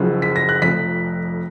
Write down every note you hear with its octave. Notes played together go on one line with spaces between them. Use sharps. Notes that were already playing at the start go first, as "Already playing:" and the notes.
Already playing: F#1 F#2 C#3 F3
B6
A#6
F#6
F1 F2 F3 B6